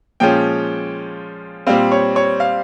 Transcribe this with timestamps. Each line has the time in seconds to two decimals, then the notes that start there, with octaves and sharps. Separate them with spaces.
0.20 A#2 F3 G#3 C#4 G5
1.67 A#2 G3 C4 F5
1.92 C#5
2.16 C#5
2.40 F5